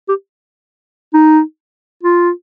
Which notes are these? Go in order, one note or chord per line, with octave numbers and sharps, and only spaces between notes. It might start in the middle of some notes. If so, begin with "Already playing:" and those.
G4
D#4
F4